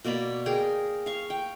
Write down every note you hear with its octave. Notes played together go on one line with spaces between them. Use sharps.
B2 A#3 D5 B5
G#4 A#4 G5
F5 C#6
G5